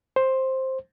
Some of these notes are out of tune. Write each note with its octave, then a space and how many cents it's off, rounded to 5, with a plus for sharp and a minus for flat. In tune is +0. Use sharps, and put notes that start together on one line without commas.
C5 +10